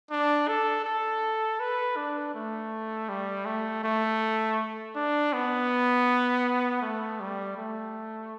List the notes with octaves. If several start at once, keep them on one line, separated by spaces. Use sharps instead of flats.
D4
A4
A4
B4
D4
A3
G3
A3
A3
D4
B3
A3
G3
A3